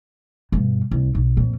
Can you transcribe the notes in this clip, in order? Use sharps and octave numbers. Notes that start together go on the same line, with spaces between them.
G2 B2
C2
B1
F2 A#2